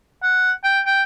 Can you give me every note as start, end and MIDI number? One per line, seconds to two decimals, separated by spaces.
0.23 0.52 78
0.64 0.80 79
0.86 1.02 79